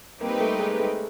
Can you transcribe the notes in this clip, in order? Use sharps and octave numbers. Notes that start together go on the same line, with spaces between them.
G3 A#3 C4 D#4 G4 B4
A3
G#3
A3